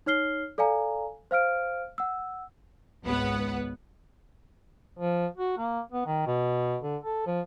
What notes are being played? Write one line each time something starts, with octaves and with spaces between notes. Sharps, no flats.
D#4 C#5 F6 C7 G7
A4 D5 F5 G#5 A#5
C5 F5 F6 D7
F#5 E6
G#1 C#2 B3 B4 F#5
F3
F#4
A#3
B3
D#3
B2
D3
A4
F3